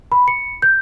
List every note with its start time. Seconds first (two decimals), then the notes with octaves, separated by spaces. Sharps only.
0.12 B5
0.28 C#7
0.62 G6